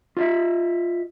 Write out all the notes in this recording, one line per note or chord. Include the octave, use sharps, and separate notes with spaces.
F4 D#5 E5